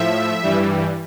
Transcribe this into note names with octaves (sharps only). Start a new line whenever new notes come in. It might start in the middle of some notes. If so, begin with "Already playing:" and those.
Already playing: A2 F3 E5
G2 E3 G3